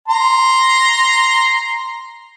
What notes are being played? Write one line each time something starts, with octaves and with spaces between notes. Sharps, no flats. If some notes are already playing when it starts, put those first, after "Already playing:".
A#5 C6